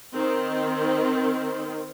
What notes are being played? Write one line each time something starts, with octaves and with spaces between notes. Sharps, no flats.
D#3 C4